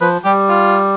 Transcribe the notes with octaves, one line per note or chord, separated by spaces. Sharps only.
F3 B4
G3 G4
F4